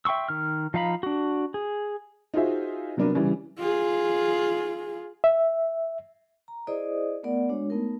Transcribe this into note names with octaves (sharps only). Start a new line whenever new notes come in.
E5 G5 C6 C#6 E6
D#3 F6
F3 D#4 F5 A#5 B5
D4 F#4
G#4
D#4 F4 F#4 G#4 C5 E5
C3 F#3 B3 D4 A#4 B4
C#3 E3 G3 C#4
F4 G#4
E5
A#5
E4 G#4 C5 D5 D#5 D#6
A3 B3 A#4 D5 F#5
G#3 D4 F#4 C#5
A3 B3 D#4 A#4